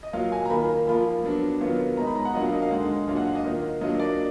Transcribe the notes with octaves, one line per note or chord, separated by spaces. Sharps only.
D#5
F#3 A#3 F4 F5
G#5
A#5
D#3 A#3 F4 B5
F3 A#3 F4 B5
F#3 B3 D4
D#3 F#3 B3 F4
B2 G#3 D#4 A#5
B5
A#5
F#5
F#3 A#3 D4 F4 D#5
F5
D#5
F5
D3 G#3 D#4 F#5
A#2 F#3 D4 F4 F5
F#5
F5
D#5
D#3 A#3 F4
F#3 A#3 D4 F4 D#5
D5